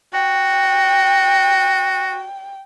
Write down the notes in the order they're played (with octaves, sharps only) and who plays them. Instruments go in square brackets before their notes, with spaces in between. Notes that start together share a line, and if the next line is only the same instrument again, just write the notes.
[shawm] F#4 [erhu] G5